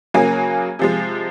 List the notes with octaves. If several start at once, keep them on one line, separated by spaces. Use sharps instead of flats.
C#3 F#3 A#3 G#5
C3 F3 G#3